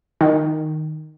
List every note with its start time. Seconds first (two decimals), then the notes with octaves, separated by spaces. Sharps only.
0.21 D#3